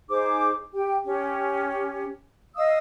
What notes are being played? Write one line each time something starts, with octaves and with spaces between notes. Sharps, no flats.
D#4 G#4 C5 D6
G4 G5
C#4 G4
D#5 F5 D#6 E6